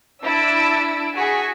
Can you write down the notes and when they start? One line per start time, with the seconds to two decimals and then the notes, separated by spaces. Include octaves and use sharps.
0.22 D4 E4 A5 E6 D7
1.14 F#4 G#4 G#5 C#6 B6